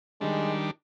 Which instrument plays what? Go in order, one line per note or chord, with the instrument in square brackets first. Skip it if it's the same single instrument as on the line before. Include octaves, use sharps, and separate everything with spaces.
[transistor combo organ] D#3 G3 D4 [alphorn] G#3